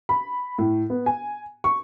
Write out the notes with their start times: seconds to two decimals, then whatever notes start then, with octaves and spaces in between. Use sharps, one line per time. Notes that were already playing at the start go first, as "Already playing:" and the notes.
0.09 B5
0.59 A2
0.90 B3
1.06 G#5
1.64 C#6